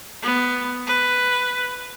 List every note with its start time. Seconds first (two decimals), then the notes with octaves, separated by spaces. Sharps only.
0.23 B3
0.87 B4